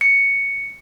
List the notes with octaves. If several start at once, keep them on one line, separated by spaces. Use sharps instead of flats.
C#7